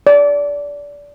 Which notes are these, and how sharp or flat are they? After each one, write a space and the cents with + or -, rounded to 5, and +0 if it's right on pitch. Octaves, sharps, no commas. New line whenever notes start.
D5 -25